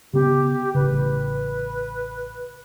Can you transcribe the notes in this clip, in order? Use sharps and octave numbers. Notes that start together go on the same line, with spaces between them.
C#3 B3 G4
A1 C#3 B4